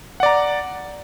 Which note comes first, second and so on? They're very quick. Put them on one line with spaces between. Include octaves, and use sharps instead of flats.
F#5 D5 A#5